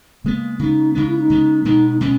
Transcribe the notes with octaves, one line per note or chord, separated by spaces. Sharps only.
C#3 G#3 A#3 B3
C#3 G#3 B3 D#4
C#3 G#3 B3 D#4
E4
D#4
C#3 G#3 B3
B2 G#3 B3 D#4
D#4
B2 G#3 B3 C#4